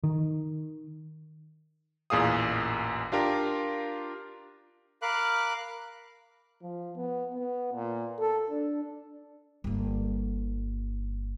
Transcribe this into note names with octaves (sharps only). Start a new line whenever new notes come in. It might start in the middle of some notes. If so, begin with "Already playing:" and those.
D#3
A1 E2 A#2 G#4 F5 D#6
D4 F4 G4 A#4
A#4 F5 B5 D6 F#6
F3
B3
B3
A#2
A4
D4
G1 A#3